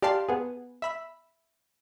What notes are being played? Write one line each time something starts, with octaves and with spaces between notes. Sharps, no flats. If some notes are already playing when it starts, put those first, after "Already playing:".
G4 D5 F5 A5 C6
B3 G#4
E5 B5 E6